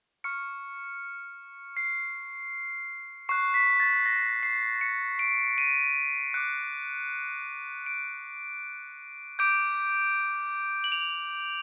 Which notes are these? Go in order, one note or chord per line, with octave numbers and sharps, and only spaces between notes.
C#6 F6 C#7
C7
C#6 F#6 C7
B6
A6
A#6
C7
C#7
D7
D#7
D6 F#6 C#7
D7
D6 G6 D7
F#7
F7